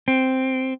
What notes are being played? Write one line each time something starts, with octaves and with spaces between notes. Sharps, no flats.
C4